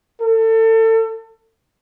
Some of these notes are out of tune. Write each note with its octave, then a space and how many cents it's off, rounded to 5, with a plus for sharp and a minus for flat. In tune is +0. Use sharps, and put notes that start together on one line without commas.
A4 +30